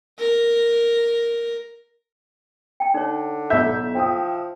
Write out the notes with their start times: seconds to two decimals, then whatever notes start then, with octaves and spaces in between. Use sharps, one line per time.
0.19 A#4
2.80 G5 A5
2.94 D3 D#4 C#5
3.50 B1 E4 C#5 E5 B5 G6
3.95 F3 G5 D#6